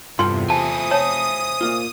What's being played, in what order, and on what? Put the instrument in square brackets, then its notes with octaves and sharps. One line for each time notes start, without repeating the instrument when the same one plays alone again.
[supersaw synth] E2 C3 [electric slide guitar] G2 [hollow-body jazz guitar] F4 A4 G5 [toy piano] C6
[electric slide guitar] C5 E5 G#5 [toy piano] A5 [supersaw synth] D#6
[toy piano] C#5 [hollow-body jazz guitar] A5
[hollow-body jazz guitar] A#2 A#3 F4